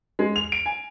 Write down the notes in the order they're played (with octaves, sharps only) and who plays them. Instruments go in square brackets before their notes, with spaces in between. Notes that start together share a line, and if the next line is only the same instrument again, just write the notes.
[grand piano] G#3
F7
D7
G#5